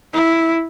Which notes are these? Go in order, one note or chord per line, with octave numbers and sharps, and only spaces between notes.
E4